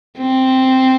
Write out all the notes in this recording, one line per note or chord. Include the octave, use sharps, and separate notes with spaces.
C4